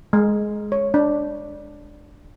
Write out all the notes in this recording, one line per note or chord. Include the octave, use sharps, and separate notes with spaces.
G#3
C#5
D4